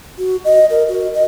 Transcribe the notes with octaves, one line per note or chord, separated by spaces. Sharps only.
F#4
D#5
A#4
F#4
D#5